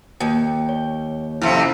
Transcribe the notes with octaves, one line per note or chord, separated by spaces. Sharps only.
D#2 G5
C#5
F2 C3 C#4 E4